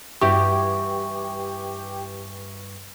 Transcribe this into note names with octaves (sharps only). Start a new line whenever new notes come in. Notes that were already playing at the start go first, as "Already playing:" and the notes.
G2 E3 E4 F#4 G4 C#6